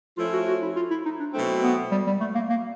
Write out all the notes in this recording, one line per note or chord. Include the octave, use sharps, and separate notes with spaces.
F3 A3 C#4 E4 F4
F#4
F#4
E4
F4
E4
D#4
D4
B2 F#3 A3 C4
B3
G3
G3
A3
A#3
A#3